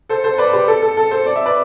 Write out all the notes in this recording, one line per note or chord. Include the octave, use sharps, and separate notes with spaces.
A4 C5
A4 C5
B4 D5
G4 B4
A4
A4
A4
A4 C5
D5
E5
B4 D5